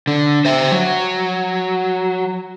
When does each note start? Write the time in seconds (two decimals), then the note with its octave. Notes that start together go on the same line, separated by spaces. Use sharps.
0.07 D3
0.45 C5 E5
0.72 F#3